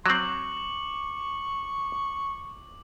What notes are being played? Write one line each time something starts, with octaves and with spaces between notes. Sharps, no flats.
F#3 C4 C#6 D6 F#7